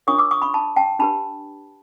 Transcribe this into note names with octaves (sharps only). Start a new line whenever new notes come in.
D4 F4 A#4 C#5 C#6 D#6
D6 E6
C#6 D#6
B5 C#6
A5 B5
G5 A5
D4 G4 B4 A5 B5